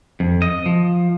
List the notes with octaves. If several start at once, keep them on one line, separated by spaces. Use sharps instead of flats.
F2
D#5
F3